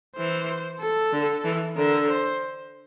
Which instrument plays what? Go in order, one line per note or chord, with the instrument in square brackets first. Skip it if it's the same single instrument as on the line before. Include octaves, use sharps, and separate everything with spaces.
[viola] E3 [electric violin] C5
[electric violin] A4
[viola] D3
E3
[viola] D3 [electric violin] A#4
[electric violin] C5